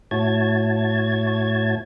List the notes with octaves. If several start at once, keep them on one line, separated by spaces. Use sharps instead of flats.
A2 E4 F#4 C#5 A5 G#6